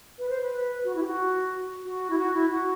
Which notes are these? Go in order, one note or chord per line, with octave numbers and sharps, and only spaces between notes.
B4
C5
B4
F#4
E4
G4
F#4
F#4
E4
F#4
E4
F#4